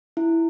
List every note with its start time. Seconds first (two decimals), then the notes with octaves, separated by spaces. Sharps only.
0.17 E4